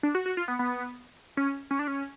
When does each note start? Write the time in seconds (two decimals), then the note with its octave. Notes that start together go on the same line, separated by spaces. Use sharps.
0.03 D4
0.15 F#4
0.26 F#4
0.37 F4
0.48 B3
0.59 B3
1.37 C#4
1.71 C#4
1.79 D4
1.88 C#4